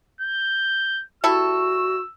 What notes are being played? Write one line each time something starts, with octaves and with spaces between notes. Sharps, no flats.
G6
G3 E4 F#4 A4 E6